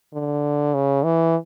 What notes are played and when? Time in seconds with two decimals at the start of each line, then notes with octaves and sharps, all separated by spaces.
0.13 D3
0.74 C#3
1.04 E3